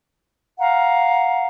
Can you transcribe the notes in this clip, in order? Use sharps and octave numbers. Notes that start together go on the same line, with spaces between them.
F5 F#5 A#5